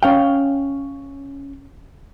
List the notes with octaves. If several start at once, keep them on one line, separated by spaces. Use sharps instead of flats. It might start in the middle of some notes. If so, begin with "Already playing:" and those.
C#4 F5 G5